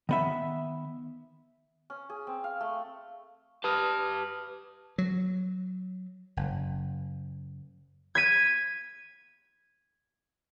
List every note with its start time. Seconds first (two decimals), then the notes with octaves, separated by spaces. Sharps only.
0.09 D#3 B3 E5
1.90 C#4
2.10 G#4
2.27 C4
2.44 F5
2.60 A3
3.64 G4 B4 A5 D#6 F6
4.98 F#3
6.37 F#1
8.15 G#6 B6 D#7